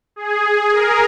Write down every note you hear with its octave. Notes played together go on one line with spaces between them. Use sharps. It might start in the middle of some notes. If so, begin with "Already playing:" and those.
G#4
A#4